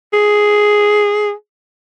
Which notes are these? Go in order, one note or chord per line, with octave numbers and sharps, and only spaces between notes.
G#4